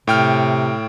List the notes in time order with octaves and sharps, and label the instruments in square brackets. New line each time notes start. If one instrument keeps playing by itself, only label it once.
[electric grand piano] A2 G5 F6 [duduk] C3